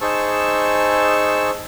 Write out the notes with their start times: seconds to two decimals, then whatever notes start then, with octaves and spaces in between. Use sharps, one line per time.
0.01 D#4 G#4 C5 A5 C#6 E6